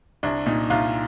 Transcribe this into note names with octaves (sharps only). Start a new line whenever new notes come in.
C2 D4
A#2 D#4
C2 F4